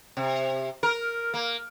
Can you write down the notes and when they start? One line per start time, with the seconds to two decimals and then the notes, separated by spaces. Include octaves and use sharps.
0.17 C3
0.83 A#4
1.34 A#3